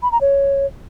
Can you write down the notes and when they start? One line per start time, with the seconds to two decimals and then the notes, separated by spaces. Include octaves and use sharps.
0.03 B5
0.12 A#5
0.21 C#5